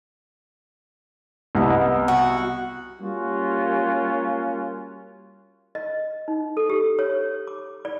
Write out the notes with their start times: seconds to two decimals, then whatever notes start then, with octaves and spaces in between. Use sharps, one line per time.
1.55 C2 B3 D#5
2.08 F#4
3.00 G3 A#3 C#4 F4 F#4
5.75 D#5
6.28 D#4
6.57 A4
6.70 G4
6.99 C#5
7.47 D6
7.85 D5